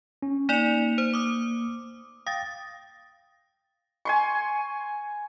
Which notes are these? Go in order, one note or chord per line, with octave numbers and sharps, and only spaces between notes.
C#4
A#3 D#4 D5 C#7 F7
C5
D6 D#6
F5 G5 D#6 A6 A#6
G#5 C6 C#6